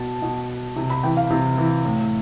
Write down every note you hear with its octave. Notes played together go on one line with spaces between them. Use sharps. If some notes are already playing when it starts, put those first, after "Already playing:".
Already playing: B2 A5
B2
C3
B5
E3 G5
F5
C3
E3
A2